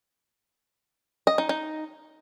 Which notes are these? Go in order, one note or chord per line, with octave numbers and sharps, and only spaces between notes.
D#5
D#4
D#4